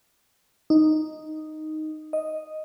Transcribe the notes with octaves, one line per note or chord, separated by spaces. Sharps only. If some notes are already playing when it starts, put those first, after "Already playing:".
D#4
D#5